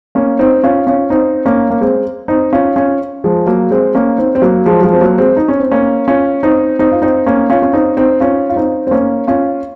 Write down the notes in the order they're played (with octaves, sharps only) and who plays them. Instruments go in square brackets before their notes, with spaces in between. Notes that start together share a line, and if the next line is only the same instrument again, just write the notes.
[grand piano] A#3 C#4
C4 D#4
C#4 F4
C#4 F4
C4 D#4
A#3 C#4
A#3
G#3 C4
C4 D#4
C#4 F4
C#4 F4
F3 G#3
F#3 A#3
G#3 C4
A#3 C#4
C4 D#4
C4
F#3 A#3
F3 G#3
F#3
F3 G#3
C4
F#3 A#3
G#3 C4
D#4
C#4
C4
A#3 C#4
C#4 F4
C4 D#4
C4 D#4
F4
C4 D#4
A#3 C#4
C#4 F4
C#4
C4 D#4
C4 D#4
C#4 F4
F4
C4 D#4
C4
A#3 C#4
C#4 F4